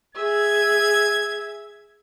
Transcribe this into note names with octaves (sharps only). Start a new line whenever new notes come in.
G#4 E5 G#6